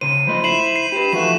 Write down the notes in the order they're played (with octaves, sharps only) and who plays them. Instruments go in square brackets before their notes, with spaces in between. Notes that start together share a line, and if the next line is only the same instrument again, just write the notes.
[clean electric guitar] C#3 C5 [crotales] D#7
[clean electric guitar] F3 A3 D#5 [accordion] C5 B5
[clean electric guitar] E4 [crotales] C7 E7 F#7
[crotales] C7
[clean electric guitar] G4 B4 [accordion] B5
[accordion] E3 A3 F#4 [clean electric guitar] F3 E5 [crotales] E7